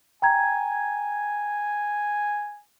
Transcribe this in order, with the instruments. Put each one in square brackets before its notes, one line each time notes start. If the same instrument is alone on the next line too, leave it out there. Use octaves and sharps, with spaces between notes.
[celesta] G5 A#5 G#6 [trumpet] G#5